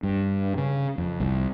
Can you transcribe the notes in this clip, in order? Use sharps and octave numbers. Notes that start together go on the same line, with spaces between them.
G2
C#3
F2
C2